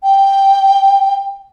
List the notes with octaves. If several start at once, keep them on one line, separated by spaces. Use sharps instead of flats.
G5